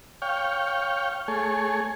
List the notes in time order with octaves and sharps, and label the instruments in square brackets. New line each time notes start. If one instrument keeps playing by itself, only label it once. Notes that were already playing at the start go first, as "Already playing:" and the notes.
[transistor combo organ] C#5 F5 G5
A3 G#4 C#5